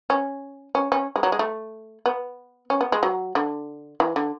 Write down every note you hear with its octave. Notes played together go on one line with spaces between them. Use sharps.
C#4
C#4
C#4
G#3
F#3
G#3
A3
B3
C#4
B3
G#3
F#3
D3
E3
D3